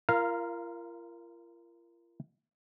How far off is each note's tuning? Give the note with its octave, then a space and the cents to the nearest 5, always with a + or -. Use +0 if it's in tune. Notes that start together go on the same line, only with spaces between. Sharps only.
F4 -40 A#4 +0 F5 -10